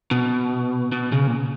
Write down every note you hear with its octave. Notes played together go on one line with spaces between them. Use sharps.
B2
B2
C#3
A#2